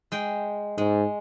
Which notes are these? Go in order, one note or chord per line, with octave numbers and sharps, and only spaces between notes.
G#3 G5
G#2 G#3